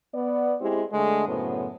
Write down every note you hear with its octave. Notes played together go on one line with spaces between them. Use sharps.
B3 D5
G#3 C4 E4 G4
D3 G#3 A3
F#2 A2 C#3 B3 C5